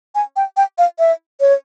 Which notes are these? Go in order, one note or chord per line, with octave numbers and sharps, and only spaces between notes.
G#5
G5
G5
F5
E5
C#5